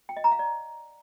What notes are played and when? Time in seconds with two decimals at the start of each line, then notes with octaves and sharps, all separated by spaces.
0.09 G5
0.17 D#5
0.24 A#5
0.32 F5
0.39 D5